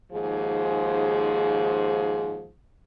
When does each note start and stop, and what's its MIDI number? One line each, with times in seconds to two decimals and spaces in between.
0.11 2.48 39
0.11 2.48 44
0.11 2.48 53
0.11 2.48 68